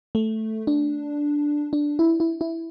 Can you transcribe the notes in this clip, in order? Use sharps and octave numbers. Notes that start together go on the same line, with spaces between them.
A3
D4
D4
E4
E4
E4